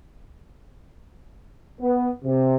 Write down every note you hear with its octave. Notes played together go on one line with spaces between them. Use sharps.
B3
C3